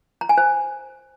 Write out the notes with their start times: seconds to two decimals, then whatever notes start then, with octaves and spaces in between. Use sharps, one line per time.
0.21 A#5
0.29 G#5
0.38 C5